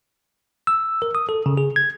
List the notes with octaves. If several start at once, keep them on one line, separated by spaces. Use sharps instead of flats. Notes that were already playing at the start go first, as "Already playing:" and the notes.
E6
A#4
D#6
A4
C#3
G#4
G#6